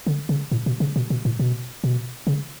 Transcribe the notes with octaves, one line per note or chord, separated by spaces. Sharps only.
D3
C#3
A2
B2
C#3
B2
B2
A2
B2
B2
C#3